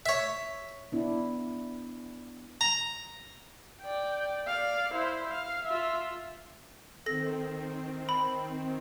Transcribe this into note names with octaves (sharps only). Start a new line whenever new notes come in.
C#5 E5
B3 D4 E4
A#5
D5 G5
D5 F5
E4 C5
F5
F4 E5
D#3 C4 A4 A#6
B5